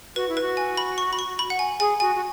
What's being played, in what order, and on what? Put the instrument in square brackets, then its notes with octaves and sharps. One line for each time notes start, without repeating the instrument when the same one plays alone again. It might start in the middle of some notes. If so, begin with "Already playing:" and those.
[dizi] F#4 [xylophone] B4
[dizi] E4
[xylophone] B4
[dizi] F#4
[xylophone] G#5
B5
C#6
B5
C#6
B5
F#5
G#5
[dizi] G#4 [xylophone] G#5
[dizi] F#4 [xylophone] G#5
[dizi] F#4